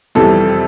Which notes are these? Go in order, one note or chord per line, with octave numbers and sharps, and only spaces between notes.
F2 C3 E3 G3 A4